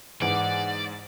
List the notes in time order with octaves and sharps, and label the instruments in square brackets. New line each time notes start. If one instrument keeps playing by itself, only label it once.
[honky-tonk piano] G#2 E3 [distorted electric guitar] D5 [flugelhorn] F#5